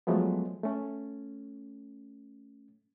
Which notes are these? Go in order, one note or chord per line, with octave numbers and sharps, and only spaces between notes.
F3 F#3 G#3 A3 B3
A3 C#4